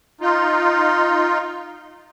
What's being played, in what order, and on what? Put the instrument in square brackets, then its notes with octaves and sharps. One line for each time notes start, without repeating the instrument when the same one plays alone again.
[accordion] D#4 F4